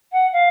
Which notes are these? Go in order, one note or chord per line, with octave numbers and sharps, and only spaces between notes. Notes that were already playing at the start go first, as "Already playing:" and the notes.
F#5
F5